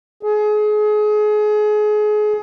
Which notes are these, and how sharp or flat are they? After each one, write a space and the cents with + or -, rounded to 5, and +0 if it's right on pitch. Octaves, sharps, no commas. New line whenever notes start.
G#4 +30